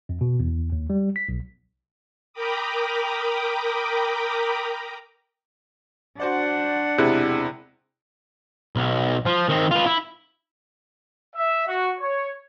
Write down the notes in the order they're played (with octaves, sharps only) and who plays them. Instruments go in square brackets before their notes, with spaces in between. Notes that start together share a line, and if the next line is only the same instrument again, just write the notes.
[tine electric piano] F2
B2
E2
D#2
G3
B6
B1
[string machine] A#4 G5 A#5 B5 D6 D#6
[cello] D4 F#5 [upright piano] F#4 C5 D5
[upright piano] E1 G#3 F#6 [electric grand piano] C3 E4
[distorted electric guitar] B1
F3
D#3 C4
F4 B4
E4
[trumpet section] E5
F#4
C#5